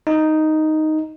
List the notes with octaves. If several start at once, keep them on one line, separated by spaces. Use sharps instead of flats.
D#4